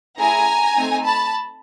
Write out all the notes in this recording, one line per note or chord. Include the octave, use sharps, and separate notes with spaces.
A3 C#4 E4 G#4 G#5 A#5
A3 C4 D#4
A5 B5